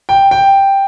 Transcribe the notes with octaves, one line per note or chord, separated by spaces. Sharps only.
G5
G5